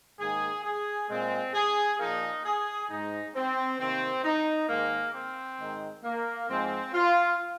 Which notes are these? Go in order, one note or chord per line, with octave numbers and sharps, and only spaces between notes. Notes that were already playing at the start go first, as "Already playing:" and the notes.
G#2 D#3 A#3 G#4
G#4
A#2 G#3 C4
G#4
A#2 F3 A#3 D#4
G#4
G#2 G#3 D#4
C4
C3 D#3 A#3 C4
D#4
G#2 D#3 G#3 A#3
C4
G#2 D#3 G#3
A#3
G#2 F3 G#3 C4
F4